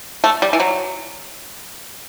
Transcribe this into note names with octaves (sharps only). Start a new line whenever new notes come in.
A3
G3
E3
F#3